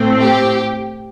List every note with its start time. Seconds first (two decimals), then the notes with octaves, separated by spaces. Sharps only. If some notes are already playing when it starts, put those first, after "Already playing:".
Already playing: A2 A3 C4
0.21 G4